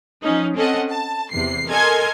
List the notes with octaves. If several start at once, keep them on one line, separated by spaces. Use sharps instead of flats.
F3 C#4 D#4
C4 C#4 A4 D#5 F#5
A5
E2 C3 C7
A4 A#4 D#5 G#5 C6 G#6